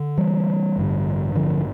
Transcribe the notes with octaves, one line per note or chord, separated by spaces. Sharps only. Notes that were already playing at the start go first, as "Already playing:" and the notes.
Already playing: D3
E3 G3
A1 G2 D3
D3 F3